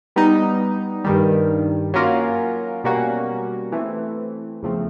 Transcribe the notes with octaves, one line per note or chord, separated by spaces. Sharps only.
G3 B3 D#4
G2 D#3 G3
F#3 A#3 C#4 F4 A#4
B2 G3 A#3 C#4 F#4
E3 A3 C4
E2 C#3 F3 A3 C4